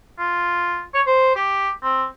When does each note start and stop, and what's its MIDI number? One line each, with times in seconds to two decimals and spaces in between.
0.18 0.83 65
0.94 1.01 73
1.06 1.32 72
1.35 1.69 67
1.83 2.05 60